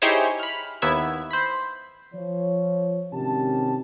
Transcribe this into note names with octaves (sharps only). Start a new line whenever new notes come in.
D#4 E4 G4 G#4 C5 C#5
B5 F6
D#2 B3 E4 E5 G#6
C5 B5
F3 C#5
G#1 C3 D#3 C#4 G4 A5